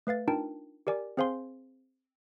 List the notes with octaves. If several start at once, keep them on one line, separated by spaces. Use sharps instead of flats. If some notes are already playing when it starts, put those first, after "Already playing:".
A3 B4 F5 A6
D4 D#4 F4 A#4 G5 A5
G4 A#4 D5 G#5 D6
C4 G#4 C5 F5 G#5 C6